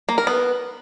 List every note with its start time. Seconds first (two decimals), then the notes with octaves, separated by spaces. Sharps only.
0.09 A#3
0.18 A#4
0.27 B3